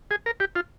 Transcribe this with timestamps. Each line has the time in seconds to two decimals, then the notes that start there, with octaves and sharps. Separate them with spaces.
0.11 G#4
0.26 A#4
0.40 G4
0.56 F4